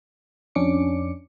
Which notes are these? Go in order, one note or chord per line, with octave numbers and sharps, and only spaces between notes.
F2 C#4 D4 D6 C#7